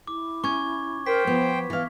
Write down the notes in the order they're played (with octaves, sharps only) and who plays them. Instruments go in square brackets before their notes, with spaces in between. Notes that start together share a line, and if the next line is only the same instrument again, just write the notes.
[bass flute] E4 [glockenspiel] D6
[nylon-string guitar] C#4 [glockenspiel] C#6 G#6
[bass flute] A#4 [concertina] C5 G5 [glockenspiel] B6
[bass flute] F3 [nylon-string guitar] B3
[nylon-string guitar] E3 F5